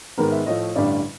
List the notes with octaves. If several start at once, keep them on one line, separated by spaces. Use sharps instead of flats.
G#2 D#3 G#3 B3 A#4
E5
A2 F3 A3 D#5
A1 G2 D3 G3 D5